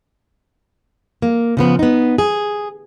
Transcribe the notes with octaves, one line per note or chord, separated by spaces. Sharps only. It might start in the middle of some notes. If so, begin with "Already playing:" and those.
A#3
C#3 F3 B3
B3 D#4
G#4